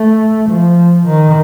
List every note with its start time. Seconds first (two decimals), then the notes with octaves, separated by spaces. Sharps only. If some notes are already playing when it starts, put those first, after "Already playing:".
Already playing: A3
0.49 F3
1.06 D#3